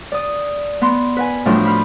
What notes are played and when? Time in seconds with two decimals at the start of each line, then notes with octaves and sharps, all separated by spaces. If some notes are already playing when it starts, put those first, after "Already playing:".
0.12 D5 D#6
0.81 B3 C6
1.17 B4 F#5 G#5
1.46 A2 F3 F#3 D4
1.66 F4 B5